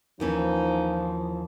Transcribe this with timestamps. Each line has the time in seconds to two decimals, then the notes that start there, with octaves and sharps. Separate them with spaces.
0.20 D#2 E3 F3 C#4 D#4